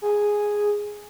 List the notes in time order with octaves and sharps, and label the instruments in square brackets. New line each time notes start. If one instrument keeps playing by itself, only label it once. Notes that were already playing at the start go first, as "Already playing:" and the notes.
[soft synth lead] G#4